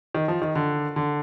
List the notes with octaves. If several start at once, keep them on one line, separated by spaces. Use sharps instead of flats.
D#3
F3
D#3
D3
D3